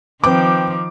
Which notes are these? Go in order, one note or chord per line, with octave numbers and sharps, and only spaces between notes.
D#3 F3 C4 B4 G5 D6